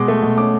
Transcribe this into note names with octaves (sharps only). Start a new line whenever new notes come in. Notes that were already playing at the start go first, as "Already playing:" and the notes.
Already playing: B2 G#3 D6
A3
B2
C#4 D6